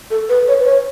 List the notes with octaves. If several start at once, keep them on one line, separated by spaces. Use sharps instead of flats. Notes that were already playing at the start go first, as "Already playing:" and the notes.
A4
B4
C#5
B4
C#5